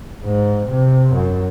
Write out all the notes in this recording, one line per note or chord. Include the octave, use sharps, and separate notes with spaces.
G#2
C3
F#2